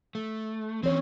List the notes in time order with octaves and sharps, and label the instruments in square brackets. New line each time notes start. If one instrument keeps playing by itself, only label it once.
[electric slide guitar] A3
[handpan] E3 C#5 [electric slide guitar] C4 C#4